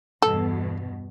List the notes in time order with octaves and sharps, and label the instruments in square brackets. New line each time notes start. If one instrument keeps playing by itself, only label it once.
[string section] E2 G2 B2 [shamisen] A4